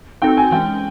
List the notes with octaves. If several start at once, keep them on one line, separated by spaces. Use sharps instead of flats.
C4 D#4 F#4 A4 G5
G#5
E3 G#3 C#4 G5